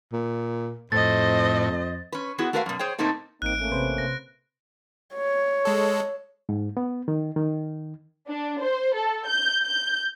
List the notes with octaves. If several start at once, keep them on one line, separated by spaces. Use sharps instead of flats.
A#2
F2 A2 C5 D#5 A6
C#4 B4
B3 E4 F#4 G#4 B4
A3 F#4 A#4 B4 E5 F5
F#2 B2
G#4 C5 C#5 G5
B2 A3 A#3 C4 D#4 A4
A1 A#3 C4 D#4 F#6 D7
A3 A#3 C#4
C3 B4 C5
A#6
C#5
G#3 A4
G#2
B3
D#3
D#3
D4
C5
A4
G6
G6